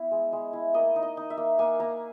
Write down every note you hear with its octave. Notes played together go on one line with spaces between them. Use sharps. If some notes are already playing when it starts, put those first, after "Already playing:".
Already playing: B3 E4
G#3
G#3
E4
A#3 D#5
D#4
D#5
D#4
E5
A#3
A#3 G#5
A#3 A#5